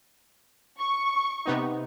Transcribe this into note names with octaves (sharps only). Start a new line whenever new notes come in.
C#6
C3 B3 D#4